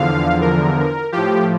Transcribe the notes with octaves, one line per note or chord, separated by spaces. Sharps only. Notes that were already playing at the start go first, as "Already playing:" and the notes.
Already playing: E2 D3 F3 F5
A#4
A2 F3 G4